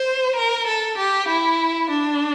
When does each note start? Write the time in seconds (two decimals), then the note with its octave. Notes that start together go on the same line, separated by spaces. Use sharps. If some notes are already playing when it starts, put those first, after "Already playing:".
Already playing: C5
0.35 A#4
0.66 A4
0.97 G4
1.28 E4
1.90 D4